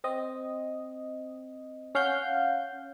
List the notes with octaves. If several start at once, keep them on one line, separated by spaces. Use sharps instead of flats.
C4 D#5
C#4 F5 F#5 G6